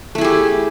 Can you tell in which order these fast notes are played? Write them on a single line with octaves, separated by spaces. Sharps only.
A3 E4 G#4 G4